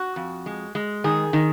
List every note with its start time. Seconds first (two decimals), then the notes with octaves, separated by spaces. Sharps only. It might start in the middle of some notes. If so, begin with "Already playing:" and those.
Already playing: F#4
0.16 F2
0.46 G#3
0.75 G#3
1.04 D#3 G#4
1.33 D#3